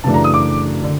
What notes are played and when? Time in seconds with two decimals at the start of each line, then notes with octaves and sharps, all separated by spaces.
0.04 F#2 C#3 E3 A3 D4 A5
0.14 A#5
0.24 D#6
0.34 D6
0.84 D3